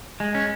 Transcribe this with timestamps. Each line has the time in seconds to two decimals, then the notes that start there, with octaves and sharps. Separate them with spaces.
0.20 G#3
0.35 C#4